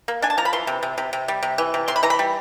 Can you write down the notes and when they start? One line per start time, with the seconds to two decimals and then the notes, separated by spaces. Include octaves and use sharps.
0.08 A#3
0.22 D4 G#5
0.30 A5
0.38 F3 A#5
0.45 B5
0.53 E3 C6
0.67 C3
0.83 C3
0.98 C3
1.13 C3
1.28 G3
1.43 C3
1.58 E3
1.74 C3
1.88 C3 C6
1.96 B5
2.03 E3 A#5
2.10 B5
2.19 G3